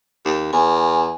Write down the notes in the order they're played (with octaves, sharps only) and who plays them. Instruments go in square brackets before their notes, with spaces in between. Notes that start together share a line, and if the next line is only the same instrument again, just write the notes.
[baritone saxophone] D#2
[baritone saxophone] E2 [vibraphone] G#5